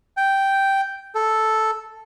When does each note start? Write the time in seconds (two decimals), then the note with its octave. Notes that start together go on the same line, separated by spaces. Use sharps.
0.17 G5
1.15 A4